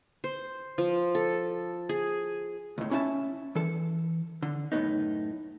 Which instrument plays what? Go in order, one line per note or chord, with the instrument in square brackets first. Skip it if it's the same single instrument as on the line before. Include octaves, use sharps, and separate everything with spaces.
[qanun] C5
F3
A4
G#4
[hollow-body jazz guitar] C#2 A2
C#4 E4 E5 F#5 A5
E3 A4
D3
F#2 A2 B3 D#4